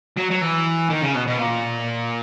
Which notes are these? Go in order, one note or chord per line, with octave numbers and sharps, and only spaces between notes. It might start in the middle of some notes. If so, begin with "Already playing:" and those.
F#3
F#3
E3
D#3
C#3
B2
B2
A#2